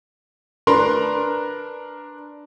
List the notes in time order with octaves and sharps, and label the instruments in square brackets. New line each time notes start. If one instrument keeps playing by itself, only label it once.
[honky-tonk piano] D4 A#4 B4 A#5 C6